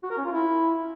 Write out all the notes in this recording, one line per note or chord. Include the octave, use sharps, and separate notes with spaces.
F#4
A#4
C#4
F4
E4